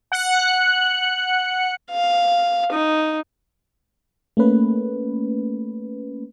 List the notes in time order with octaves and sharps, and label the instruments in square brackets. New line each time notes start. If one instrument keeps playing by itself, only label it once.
[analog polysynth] F#5 F#6 C#7
[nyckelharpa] F5
D#4
[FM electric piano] A3 A#3 C#4 B4